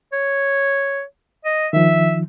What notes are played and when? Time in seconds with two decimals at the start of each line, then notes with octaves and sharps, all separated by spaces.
0.13 C#5
1.45 D#5
1.73 D#3 F3 E5